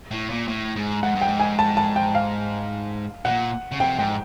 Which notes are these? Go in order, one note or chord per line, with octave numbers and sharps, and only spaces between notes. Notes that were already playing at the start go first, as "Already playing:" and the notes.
A2
A#2
A2
G#2
G#2 F#5
G2
G5
G#2
G#5
A5
A5
G5
F5
A#2 F#5
C#3
C3 G5
G#2 G5